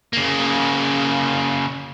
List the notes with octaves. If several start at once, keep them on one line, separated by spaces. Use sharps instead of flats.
C#3 A#3